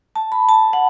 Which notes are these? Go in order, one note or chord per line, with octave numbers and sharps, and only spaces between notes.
A5
B5
A5
F#5